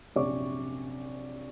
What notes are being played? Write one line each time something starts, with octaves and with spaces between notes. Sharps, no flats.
A#1 F#2 C3 D5 C#6 D6